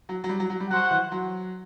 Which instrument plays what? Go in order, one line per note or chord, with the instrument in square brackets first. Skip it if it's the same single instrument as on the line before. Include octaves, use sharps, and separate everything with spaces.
[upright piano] F#3
F#3
G3
F#3
F#3
G3
[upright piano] F#3 [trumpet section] F#4 C5 F#5
[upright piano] E3
F#3